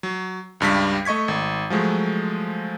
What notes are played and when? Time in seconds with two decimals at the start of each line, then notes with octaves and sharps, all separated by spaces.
0.03 F#3
0.60 C#2 G2 G3 B6
1.05 A3 D#5 C#6 G#6 B6
1.28 G#1
1.70 F3 F#3 G#3 A3